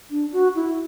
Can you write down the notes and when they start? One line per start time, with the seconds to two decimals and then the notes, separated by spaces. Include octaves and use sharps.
0.11 D4
0.33 F#4
0.55 E4